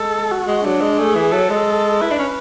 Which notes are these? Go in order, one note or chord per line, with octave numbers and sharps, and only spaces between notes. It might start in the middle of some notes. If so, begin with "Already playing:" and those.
Already playing: G#3 A4
F#4
G#3
F#3 D4
G#3
A3 G#4
E3
F#3 A4
G#3
E4 B4
D4
C#4